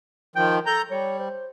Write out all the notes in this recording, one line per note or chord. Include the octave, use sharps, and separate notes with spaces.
D#3 F3 G5
A4 A#5 G6
G3 C#5
C5